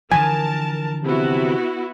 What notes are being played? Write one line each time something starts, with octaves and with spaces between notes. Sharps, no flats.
D3 E3 F3 A#4 G#5 A5
C3 B3 E4 F#4